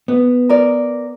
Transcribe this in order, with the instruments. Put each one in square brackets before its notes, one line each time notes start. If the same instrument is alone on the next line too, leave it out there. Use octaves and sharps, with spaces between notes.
[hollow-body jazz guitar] B3
[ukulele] A#4 D5